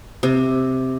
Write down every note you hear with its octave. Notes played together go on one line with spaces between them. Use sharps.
C3